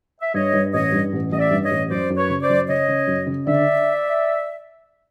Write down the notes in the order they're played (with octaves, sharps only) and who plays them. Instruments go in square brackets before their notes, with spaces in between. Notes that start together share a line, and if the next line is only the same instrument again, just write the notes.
[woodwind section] E5
[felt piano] G2 [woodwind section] C#5 D#5
[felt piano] G2
[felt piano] A1 [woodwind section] C#5 D#5
[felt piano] G2
A1
[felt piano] A1 [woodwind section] D#5
[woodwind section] D5 E5
[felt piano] G2
[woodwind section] C#5 D#5
[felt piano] A1
[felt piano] F#2 [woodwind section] C5 D5
[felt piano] F#2
[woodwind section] B4 C#5
[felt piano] C#3
[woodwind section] C5 D5
[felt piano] F#2
[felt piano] C#3 [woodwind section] C#5 D#5
[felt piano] C#3
F#2
C#3
[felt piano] D3 [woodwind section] D5 E5